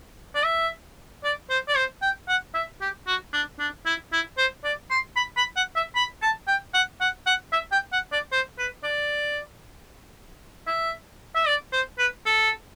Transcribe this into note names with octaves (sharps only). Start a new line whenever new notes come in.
D5
E5
D5
C5
D5
C5
G5
F#5
E5
G4
F#4
D4
D4
E4
E4
C5
D5
C6
B5
B5
F#5
E5
B5
A5
G5
F#5
F#5
F#5
E5
G5
F#5
D5
C5
B4
D5
E5
E5
D5
C5
B4
A4